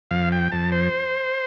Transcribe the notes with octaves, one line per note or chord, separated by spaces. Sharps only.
F2 F5
G5
F2 A5
C5